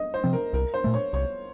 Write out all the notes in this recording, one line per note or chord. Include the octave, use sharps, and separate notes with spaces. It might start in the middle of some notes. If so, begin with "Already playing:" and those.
Already playing: D#5
C5
C3 F3 C4
A#4
C2 A#4
C5
A#2 A3
C#5
C2 C#5